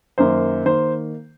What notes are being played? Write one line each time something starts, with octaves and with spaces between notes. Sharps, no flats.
F#2 D#3 A#3 C5
D#3 A#3 C5